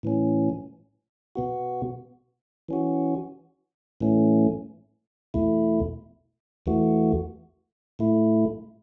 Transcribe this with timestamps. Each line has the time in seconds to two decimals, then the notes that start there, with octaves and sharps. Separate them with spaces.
0.03 A2 E3 C#4
1.36 B2 B3 F#4
2.69 E3 C#4 F#4
4.01 A2 E3 A3 C#4
5.34 E2 B2 A3 E4
6.66 E2 E3 A3 F#4
7.99 A2 A3 E4